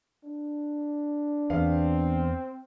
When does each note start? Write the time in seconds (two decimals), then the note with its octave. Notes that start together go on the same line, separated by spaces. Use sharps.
0.23 D4
1.50 E2 B3 C4 F5